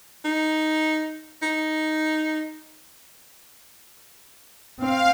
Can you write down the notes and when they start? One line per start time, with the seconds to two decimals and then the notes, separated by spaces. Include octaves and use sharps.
0.25 D#4
1.43 D#4
4.80 C4 F5